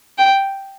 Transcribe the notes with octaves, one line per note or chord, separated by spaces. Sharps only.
G5